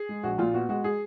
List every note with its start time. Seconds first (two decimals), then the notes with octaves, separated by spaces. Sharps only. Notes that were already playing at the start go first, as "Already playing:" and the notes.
Already playing: G#4
0.09 G#3
0.23 A#1 F#4
0.38 A#2 F4
0.54 B3 F#4
0.69 G#3 F#4
0.84 G#4